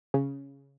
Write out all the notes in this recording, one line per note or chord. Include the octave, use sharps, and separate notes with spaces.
C#3